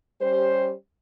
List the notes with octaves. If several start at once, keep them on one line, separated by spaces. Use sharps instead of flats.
G3 C#4 G4 C5